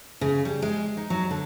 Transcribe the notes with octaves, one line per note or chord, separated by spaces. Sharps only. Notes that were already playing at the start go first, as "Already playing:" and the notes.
C#3
G3
G#3
D#4
F#3
D3